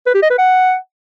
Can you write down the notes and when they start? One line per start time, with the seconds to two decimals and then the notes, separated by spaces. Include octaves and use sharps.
0.07 B4
0.14 G4
0.22 D#5
0.30 B4
0.38 F#5